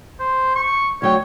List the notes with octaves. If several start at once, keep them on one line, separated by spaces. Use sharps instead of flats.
C5
C#6
D2 F#3 C#5 G5